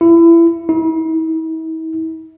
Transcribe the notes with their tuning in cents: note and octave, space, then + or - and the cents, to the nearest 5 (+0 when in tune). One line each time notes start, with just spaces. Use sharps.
E4 +25
E4 -45